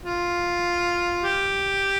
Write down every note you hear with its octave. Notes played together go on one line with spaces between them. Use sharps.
F4
G4